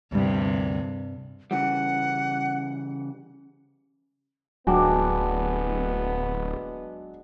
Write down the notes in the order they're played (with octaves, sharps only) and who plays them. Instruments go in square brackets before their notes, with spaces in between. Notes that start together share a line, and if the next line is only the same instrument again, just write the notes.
[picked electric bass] D2 G3 [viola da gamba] G2 C3
[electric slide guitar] C#3 E3 G3 [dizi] F#5
[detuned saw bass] D1 [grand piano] F#3 F#4 G5 [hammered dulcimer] G#3 D4 [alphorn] B3